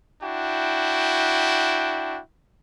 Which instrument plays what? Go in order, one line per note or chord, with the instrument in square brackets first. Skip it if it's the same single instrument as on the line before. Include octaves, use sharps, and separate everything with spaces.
[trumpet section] D4 E4 F#4 G5